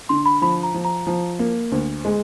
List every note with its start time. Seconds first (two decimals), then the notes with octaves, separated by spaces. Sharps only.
0.09 D3 C6
0.26 B5
0.42 F3 B5
0.63 A#5
0.74 F3
0.85 A#5
1.07 F3
1.39 A#3
1.72 D2
2.05 G#3